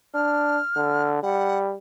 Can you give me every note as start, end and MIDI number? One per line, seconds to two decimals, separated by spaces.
0.14 0.59 62
0.14 1.10 89
0.76 1.20 50
1.23 1.76 55
1.23 1.59 78